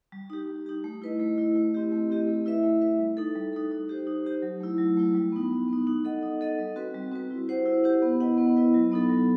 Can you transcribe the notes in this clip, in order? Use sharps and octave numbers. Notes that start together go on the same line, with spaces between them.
G3
D#4 G4
G3
D#4 G4
A3
E4 B4 D#5
A3
E4 B4 D#5
A3
C4 E4 G4 D#5
A3
C4 E4 G4 D#5
A3
E4 B4 E5
A3
E4 B4 E5
G3
D#4 A4
G3
D#4 A4
D#4
G4 C5
D#4
G4 C5
F#3
A3 E4
F#3
A3 E4
G3
B3 D#4
G3
B3 D#4
D#4
A4 D#5 F#5
D#4
A4 D#5 F#5
G3
C4 F#4 B4
G3
C4 F#4 B4
E4
G4 C5 F#5
E4
G4 C5 F#5
B3
E4 B4 D#5 F#5
B3
E4 B4 D#5 F#5
F#3
B3 D#4 A4
F#3